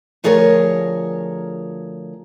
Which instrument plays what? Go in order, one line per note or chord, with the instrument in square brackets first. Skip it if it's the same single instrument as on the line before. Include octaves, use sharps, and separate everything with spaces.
[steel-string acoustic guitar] D2 F3 G#4 A#4 C#5